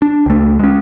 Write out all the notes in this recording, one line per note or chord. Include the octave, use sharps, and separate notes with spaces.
D4
C#2 A3
G#3 C#4